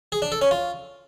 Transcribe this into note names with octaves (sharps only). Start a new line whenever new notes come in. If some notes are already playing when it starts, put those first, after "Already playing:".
G#4
D4
A4
C#4
F4